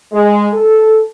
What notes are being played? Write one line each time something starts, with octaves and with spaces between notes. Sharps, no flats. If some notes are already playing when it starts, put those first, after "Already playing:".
G#3
A4